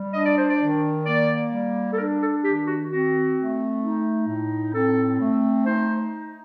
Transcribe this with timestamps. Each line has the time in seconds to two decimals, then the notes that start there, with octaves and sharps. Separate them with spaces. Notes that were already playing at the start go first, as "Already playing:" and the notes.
Already playing: G3
0.14 D4 D#5
0.26 D5
0.38 C5
0.50 D5
0.60 D#3
1.06 A#3 D5
1.51 G3
1.92 A4
1.98 D4 A#4
2.21 A4
2.44 D#3 G4
2.67 F#4
2.90 C4 F#4
3.36 A3
3.82 D#4
4.28 A2
4.74 C4 A4
5.20 A3
5.66 D#4 C5